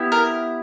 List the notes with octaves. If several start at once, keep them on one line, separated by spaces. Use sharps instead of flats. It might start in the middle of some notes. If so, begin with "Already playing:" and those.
Already playing: B3 E4 G4
A#4